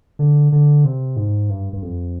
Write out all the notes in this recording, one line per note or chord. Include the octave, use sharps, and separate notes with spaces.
D3
D3
C3
G#2
G2
G2
F2